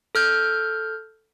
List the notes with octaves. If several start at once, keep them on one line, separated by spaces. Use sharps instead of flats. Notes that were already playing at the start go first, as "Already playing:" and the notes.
A4 F6 G6